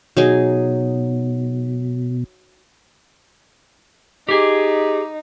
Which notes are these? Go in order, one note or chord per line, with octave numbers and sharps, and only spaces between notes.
B2 F#3 D#4 G#4
D#4 G4 G#4